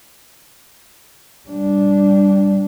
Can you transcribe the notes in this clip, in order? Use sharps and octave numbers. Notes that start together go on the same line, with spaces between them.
G3 D4